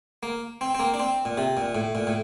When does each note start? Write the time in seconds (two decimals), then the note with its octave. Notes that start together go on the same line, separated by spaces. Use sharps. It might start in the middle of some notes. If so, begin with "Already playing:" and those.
0.23 A#3
0.61 C4
0.75 C4
0.80 A#3
0.94 D4
0.99 C4
1.25 A#2
1.38 C3
1.57 A#2
1.75 A2
1.95 A#2
2.07 A2